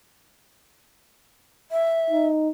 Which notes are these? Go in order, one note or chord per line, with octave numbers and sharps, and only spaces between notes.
E5
D#4